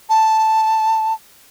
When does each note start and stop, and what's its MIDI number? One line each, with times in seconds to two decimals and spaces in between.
0.09 1.13 81